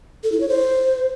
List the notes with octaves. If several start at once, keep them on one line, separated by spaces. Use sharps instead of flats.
A4
E4
C#5
C5